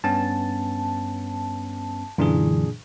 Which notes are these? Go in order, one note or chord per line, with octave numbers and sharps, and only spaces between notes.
G2 B3 C#4 A5
F#2 A#2 D3 E3 D4 G#4